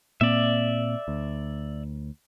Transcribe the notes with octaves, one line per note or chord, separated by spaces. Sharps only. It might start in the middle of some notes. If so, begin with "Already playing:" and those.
A#2 A#3 C4 D5 E5
D2